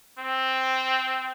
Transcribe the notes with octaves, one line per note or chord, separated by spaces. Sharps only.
C4